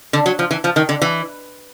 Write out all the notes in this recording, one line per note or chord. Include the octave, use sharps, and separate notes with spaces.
D3
F#3
F3
E3
F3
D#3
D3
E3